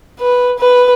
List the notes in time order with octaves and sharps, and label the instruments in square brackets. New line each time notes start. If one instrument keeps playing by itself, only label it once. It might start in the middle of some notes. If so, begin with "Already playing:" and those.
[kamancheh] B4
B4